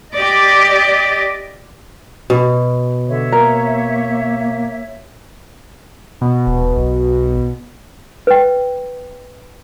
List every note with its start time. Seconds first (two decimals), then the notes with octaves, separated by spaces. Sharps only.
0.13 G4 D5 D#5
2.30 B2
3.09 D3 C#5 E5
3.32 A#3 A#4
6.21 B2
6.47 D#1
6.77 B1
8.27 B4 G5